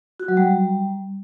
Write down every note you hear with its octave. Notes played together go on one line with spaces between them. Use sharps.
F#4
F#3
G3